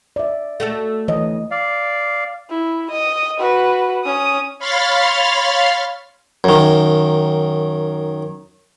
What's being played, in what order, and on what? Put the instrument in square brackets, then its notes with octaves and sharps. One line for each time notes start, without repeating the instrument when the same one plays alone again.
[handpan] D5 E5
[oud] A3 F#4 A4
[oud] D2 [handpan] E3 C#5 D#5
[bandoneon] D5 F5
[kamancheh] E4
D#5
F#4 B4
C#4 D#6
[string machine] C#5 F5 B5 C6 F6 A6
[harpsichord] F#2 D#3